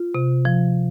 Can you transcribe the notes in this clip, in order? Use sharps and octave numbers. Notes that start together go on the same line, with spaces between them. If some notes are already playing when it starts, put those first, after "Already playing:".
Already playing: F4
C3
F3